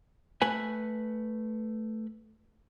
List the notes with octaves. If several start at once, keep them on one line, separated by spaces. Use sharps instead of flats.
A3 B4 G#5